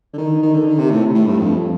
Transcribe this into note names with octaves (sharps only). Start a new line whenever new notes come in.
D3
D#3
D#3
D3
D#3
C3
A2
A2
G2
F2